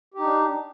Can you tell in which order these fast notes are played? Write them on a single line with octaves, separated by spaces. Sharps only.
G4 D#4 D4